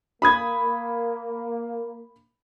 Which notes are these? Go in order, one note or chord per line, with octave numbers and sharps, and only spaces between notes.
A#3 B5 D#6 G#6